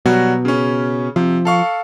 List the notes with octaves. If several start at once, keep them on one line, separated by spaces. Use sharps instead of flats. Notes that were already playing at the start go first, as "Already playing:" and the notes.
B2 F#3 G3 F#4
C#3 C#4
C3 F3
A4 F5 C#6